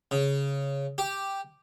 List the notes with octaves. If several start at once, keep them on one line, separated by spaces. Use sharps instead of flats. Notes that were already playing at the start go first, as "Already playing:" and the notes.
C#3
G4